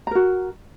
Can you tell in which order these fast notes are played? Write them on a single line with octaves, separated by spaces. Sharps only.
A#5 A#4 F#4